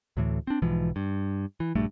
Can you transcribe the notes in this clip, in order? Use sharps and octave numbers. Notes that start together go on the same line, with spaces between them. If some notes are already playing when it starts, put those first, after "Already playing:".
D2 A2 E3
C4 D4
B1 G#2 E3 F3
G2
E3
A#1 G2 A3